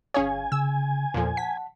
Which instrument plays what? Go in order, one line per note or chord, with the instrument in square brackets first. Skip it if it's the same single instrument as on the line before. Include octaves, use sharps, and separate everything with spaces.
[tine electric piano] G1 F5 [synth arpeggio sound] C#4 G#4 C#5 [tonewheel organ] G#5
[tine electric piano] C#3 [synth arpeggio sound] E6
[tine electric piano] E2 A4 [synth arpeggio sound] A#2 F3
[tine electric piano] F#5 A5 [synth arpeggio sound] B6